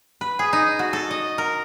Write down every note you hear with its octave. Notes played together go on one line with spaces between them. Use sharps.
B4
G#4
D#4
F#4
A4
D#5
A#4